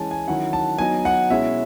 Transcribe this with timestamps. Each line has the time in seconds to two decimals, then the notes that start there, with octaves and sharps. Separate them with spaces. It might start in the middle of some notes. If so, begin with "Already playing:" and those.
Already playing: E3 G#3 C#4 E4 G#5 A5
0.11 G#5
0.28 D#3 F#3 C#4 E4 F#5
0.53 A5
0.78 F#3 B3 D#4 G#5
1.05 F#5
1.30 B2 G#3 C#4 E4 E5